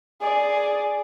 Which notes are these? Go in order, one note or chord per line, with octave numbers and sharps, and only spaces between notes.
G#4 D5